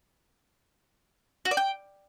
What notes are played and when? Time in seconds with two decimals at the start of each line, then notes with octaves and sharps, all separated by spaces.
1.45 F#4
1.51 D5
1.57 G5